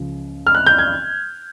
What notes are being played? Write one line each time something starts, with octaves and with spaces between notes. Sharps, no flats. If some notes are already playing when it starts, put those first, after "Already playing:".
Already playing: C#2 C#3 F3
F6
F#6
G6
G#6